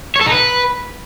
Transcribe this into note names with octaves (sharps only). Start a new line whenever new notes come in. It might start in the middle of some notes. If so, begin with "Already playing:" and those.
C#5
A4
D#4
B4